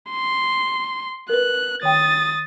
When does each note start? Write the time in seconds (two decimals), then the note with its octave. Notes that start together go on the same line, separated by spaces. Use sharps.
0.10 C6
1.29 A#4 B4 F#6
1.83 D#3 G5 D#6 A6